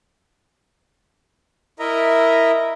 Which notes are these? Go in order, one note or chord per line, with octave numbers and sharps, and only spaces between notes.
E4 A#4 D#5 E5 A#5